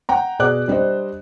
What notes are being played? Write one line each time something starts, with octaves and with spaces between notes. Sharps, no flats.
F#5 G5 A#5
B2 G#4 D5 D6 F#6
G3 D4 C5 D#5